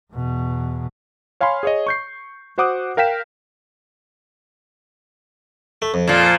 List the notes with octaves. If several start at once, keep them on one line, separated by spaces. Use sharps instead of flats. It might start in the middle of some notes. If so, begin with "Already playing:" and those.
E2 B2
C#5 F5 G#5 B5 C6
G#4 C#5 D#5
C#6 G6 C7
F#4 C5 F#5 D6 D#6 F#6
A#4 F5 G5 B6 E7
A3
F2
A#2 F3